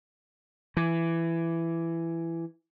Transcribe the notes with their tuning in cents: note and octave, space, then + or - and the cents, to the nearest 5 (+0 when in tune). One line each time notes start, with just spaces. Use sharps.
E3 +15